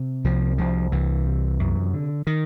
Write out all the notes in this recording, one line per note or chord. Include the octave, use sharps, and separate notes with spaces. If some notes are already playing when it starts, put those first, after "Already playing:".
Already playing: C3
C2 F3
C2 F3
C2 E3
C3
F#2
D3
D#3